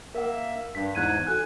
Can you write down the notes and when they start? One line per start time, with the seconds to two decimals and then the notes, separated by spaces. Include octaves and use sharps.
0.15 A#3 A#4 E5 F#5
0.75 G2 B6
0.95 E2 G#2 F#6 G#6 D#7
1.27 F#4 A4 G#5 F#6